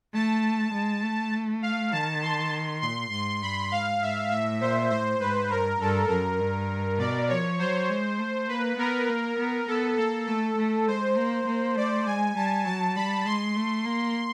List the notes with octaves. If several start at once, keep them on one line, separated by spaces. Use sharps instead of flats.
A3 A5
G#3
A3
F5
D#3 A5
C6
A#2 C6
G#2 C6
G2 B5
G#2 F5
G#2 E5
A2 E5
A#2 C5
A2 C5
G#2 B4
G2 A#4
G2 A4
F#2 A#4
G2
B2 D5
F3 C#5
F#3 C5
G#3
A3
A#3 B4
B3 A#4
A#3
B3
B3 A4
A#3 A4
A3 A4
A3
G#3 C5
A#3
A#3
A3 D5
G#3 G#5
G3 A5
F#3 A5
G3 B5
G#3 C6
A3
A#3